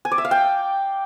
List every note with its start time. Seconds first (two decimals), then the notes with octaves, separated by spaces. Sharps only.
0.05 G#5
0.11 D5
0.18 E5
0.25 F5
0.31 G5